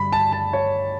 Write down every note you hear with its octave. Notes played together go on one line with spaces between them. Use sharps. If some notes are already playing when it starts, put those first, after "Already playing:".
Already playing: G2 D3 G3 B5
A5
A5
C#5